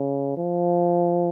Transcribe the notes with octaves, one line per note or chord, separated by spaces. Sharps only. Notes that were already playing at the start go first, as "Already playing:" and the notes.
Already playing: C#3
F3